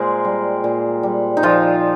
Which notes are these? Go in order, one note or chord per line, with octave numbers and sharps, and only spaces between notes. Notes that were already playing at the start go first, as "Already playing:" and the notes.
Already playing: A#2 G#3 G#4 A#4 C5
G3
A#2
G3
D#4
A#2 F3 F4